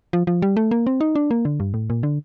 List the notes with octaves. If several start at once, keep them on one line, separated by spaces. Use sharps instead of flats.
F3
F3
G3
A3
A#3
C4
D#4
D4
A#3
D3
G2
A2
A#2
D3